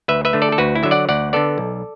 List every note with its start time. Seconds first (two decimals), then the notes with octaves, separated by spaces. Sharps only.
0.08 D2 B4 E5
0.25 B4 E5
0.33 D3 A3
0.42 A4 D5
0.52 A4
0.58 D2 F#4 B4
0.75 E4
0.83 D3 F#3 E5
0.91 D5 F#5
1.09 D2 D5 F#5
1.33 D3 B3 A4 D5
1.58 B1